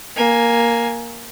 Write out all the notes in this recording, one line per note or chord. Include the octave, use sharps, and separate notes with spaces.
A#3 G#5